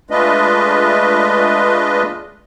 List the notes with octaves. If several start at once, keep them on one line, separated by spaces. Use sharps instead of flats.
G#3 A3 D4 F4 B4 D#5